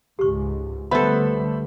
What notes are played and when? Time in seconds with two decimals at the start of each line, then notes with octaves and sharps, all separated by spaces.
0.19 C#2 G#2 G4 C#6
0.91 D3 G3 A3 B3 A4 C5 E5 B5